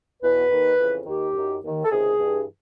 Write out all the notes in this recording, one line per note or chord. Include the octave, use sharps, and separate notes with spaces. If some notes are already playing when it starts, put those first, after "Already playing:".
E2 B2 B4
D#2 D#3
F2 C#3 E3
D#2 D#3 G4
F#2 D#3
D#2 D#3
A4
C#2 C3 D#3 G#4
G2
E3